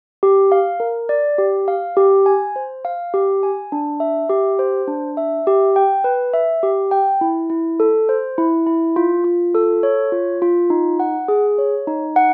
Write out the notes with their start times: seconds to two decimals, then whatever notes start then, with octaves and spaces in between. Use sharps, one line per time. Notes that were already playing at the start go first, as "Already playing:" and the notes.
0.23 G4
0.52 F5
0.80 A#4
1.09 D5
1.38 G4
1.68 F5
1.97 G4
2.26 G#5
2.56 C5
2.85 F5
3.14 G4
3.43 G#5
3.72 D4
4.00 E5
4.29 G4
4.59 C5
4.88 D4
5.17 E5
5.47 G4
5.76 G5
6.04 B4
6.34 E5
6.63 G4
6.91 G5
7.21 E4
7.50 E4
7.80 A4
8.09 C5
8.38 E4
8.66 E4
8.96 F4
9.24 F4
9.55 A4
9.83 C#5
10.12 F4
10.42 F4
10.70 D#4
11.00 F#5
11.28 G#4
11.58 C#5
11.87 D#4
12.16 F#5